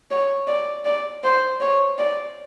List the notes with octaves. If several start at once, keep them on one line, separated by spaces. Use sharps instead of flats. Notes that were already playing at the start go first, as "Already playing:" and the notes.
C#5
D5
D5
C5
C#5
D5